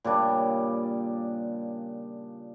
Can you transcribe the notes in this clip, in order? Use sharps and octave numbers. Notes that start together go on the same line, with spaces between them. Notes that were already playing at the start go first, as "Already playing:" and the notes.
A#2 C#3 G3 D4